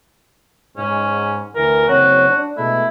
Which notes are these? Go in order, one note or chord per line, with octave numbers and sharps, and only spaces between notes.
G#2 C#4
D2 E3 A#4
F#1 C4 F#4 C#5
D4
B2 G#3 A3 E4